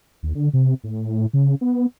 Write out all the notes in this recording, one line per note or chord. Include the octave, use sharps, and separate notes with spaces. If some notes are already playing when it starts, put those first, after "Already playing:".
D#2
D3
C3
A2
C#3
B3